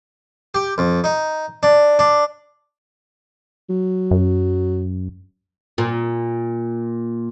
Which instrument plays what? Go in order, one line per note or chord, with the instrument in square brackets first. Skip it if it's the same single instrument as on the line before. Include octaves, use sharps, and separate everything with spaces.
[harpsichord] G4
F2
D#4
D4
D4
[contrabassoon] F#3
[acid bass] F#2
[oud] A#2